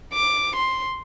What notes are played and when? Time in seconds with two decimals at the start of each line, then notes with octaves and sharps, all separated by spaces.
0.14 D6
0.56 C6